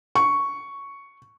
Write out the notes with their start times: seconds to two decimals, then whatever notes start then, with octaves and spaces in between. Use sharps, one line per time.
0.15 C#6